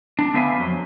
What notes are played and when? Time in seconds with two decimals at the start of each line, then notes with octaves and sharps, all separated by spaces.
0.19 D4
0.34 D3 B3 B4 E5 F5 G#5
0.58 F2 F#3